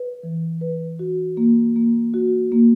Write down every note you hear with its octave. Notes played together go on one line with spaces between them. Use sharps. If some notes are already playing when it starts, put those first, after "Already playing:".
Already playing: B4
E3
B4
F#4
A#3
A#3
F#4
A#3